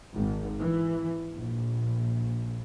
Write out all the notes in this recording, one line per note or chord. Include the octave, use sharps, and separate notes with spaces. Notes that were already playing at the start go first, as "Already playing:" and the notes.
G#1
E3
A#1